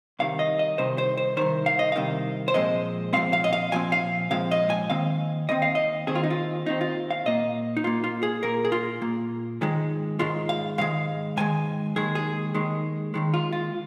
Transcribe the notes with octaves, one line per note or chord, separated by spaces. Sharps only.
C2 C3 D#3 F5
D#5
D#5
C2 C3 D#3 C5
C5
C5
C2 C3 D#3 C5
F5
D#5
C2 C3 D#3 F5
C5
A#2 F3 G#3 C4 D#5
A#2 F3 G#3 C4 F5
F5
D#5
F5
A#2 F3 C4 G#5
F5
A#2 F3 G#3 C4 F5
D#5
G#5
D#2 D#3 C4 F5
D#2 D#3 C4 D#5
F5
D#5
D#2 D#3 C4 G#4
F4
D#4
F4
D#2 D#3 C4 D#4
F4
F5
A#2 A#3 D#5
D#4
A#2 A#3 F4
F4
G#4
A#2 A#3 A#4
G#4
F4
A#2 A#3
G#2 D#3 G#3
G#2 D#3 G#3 F4
F5
G#2 D#3 G#3 F5
G#2 D#3 G#3 G#5
D#2 D#3 G#3 G#4
G#4
D#2 D#3 G#3
D#2 D#3 G#3
F4
F4